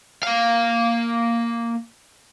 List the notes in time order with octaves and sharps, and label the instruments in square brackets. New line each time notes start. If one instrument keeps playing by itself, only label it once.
[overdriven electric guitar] A#3 F5